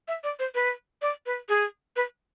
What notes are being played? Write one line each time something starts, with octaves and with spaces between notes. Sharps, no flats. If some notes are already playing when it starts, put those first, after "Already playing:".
E5
D5
C5
B4
D5
B4
G#4
B4